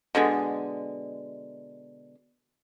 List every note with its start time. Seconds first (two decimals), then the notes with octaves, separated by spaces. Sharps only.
0.15 B2 D3 G#3